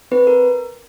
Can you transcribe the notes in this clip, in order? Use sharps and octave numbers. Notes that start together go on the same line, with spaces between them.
C4 B4
A#4